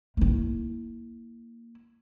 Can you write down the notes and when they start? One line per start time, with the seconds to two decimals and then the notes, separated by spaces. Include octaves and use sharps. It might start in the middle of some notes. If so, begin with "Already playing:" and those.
0.17 A#3 E4